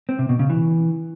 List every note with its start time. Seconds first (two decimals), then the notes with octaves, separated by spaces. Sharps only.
0.09 C4
0.19 C3
0.29 B2
0.39 C#3
0.50 E3